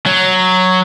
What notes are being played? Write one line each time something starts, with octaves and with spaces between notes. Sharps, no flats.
F#3